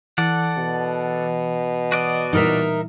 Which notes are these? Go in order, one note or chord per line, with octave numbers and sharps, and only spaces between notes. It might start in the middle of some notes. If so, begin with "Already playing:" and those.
E3 A4 D5 F#5
B2
F#4 D5 D#5
A#2 E3 G3 D#4 A#4 E5